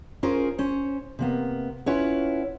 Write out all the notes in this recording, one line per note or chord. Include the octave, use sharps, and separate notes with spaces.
C#4 F4 G#4 A#4 C5
C#4 C5 C#5
C3 A#3 B3
C#4 E4 F4 B4 C#5 F#5